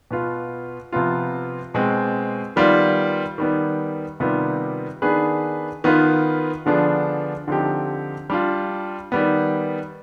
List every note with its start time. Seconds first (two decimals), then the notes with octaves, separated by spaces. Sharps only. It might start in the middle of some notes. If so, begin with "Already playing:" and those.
0.11 B2 B3 F4
0.92 C3 F3 B3 F4
1.74 B2 G#3 C4
2.56 D#3 G3 B3 F4
3.38 D#3 G3 B3
4.20 C3 D#3 G3 B3 F4
5.02 D#3 B3 D4 G#4 B4
5.84 D#3 B3 F4 B4
6.66 D3 F3 B3 D4 G#4
7.48 D3 F3 C4 D#4 G4
8.30 G3 D4 F4
9.12 D#3 G3 B3